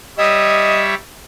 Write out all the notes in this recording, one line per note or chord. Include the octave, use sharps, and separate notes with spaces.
G3 C#5 D#5 E5